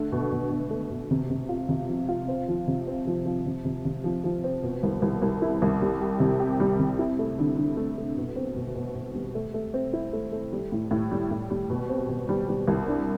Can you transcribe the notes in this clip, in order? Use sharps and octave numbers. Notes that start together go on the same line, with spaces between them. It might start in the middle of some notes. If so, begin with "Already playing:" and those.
Already playing: D3 A3
B2
B2
B2
A3
B2
C3
C3
F4
C3
F3
F4
C4
F3
C3
C4
F3
F3
C3
C3
C3
F3
F3
C4
B2
C2
C2
C2
E4
C2
G3
G4
C3
G4
G3
C3
E4
A3
D3
D3
A3
A3
B2
C4
B2
B2
B2
G3
A3
A3
C4
E4
A3
A3
G3
A2
A2
G3
A2
G3
B2
C4
B2
G3
G3
C2
D4